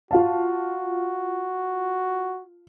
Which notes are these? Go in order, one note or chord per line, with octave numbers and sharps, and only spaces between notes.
F4 F#4 F5 A5